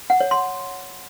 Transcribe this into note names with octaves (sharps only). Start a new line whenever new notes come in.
F#5
C#5
C6